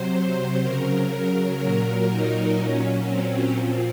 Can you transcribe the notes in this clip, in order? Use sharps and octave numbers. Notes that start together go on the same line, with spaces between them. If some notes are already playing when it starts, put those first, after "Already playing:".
Already playing: C3 F#3 C5
C#3 F#3 A#4
A#4
A#2 F#3 A#4
D#4
A#2 F#3 C#4
C4
A#2 F3 C4